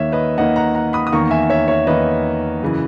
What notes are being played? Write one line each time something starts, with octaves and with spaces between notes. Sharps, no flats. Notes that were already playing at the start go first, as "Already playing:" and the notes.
Already playing: D#2 D#3 A#3 C#5 E5
B4 D#5
D#2 D#3 A#3 D#5 F#5
F#5 A#5
F#5 A#5
B5 D#6
D#6
E2 D#3 A#3 A#5 C#6
E5 G#5
C#5 E5
C#5 E5
E2 D#3 A#3 B4 D#5
F#2 C#3 E3